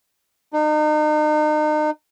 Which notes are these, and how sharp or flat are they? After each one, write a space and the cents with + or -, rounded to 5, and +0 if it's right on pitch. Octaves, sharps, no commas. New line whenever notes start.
D#4 -40